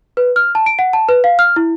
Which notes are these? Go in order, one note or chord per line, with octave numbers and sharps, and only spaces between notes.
B4
F6
A5
D7
F#5
A5
B4
F5
F6
E4